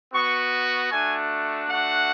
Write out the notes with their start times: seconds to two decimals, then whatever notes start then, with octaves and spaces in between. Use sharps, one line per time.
0.13 B3 F#4 C#6
0.91 A3 D4 F#4 G#5
1.69 A3 D4 F#4 F#5